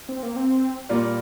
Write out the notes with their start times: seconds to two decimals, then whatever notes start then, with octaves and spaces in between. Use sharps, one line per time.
0.09 C4
0.23 A#3
0.36 C4
0.89 A#2 G3 A#3 F4